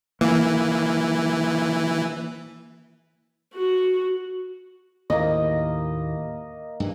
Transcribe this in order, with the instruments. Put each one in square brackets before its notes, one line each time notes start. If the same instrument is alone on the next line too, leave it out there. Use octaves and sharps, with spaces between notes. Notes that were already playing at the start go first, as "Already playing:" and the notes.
[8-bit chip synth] E3 [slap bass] A#3
[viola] F#4
[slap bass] D#2 A2 [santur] A#3 D#5
[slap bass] G2 E3